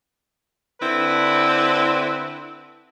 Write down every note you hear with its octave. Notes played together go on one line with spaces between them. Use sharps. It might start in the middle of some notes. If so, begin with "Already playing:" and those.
D3 C4 E4 B4